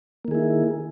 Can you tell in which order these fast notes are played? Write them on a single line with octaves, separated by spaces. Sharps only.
A#3 D#3 G#4 E4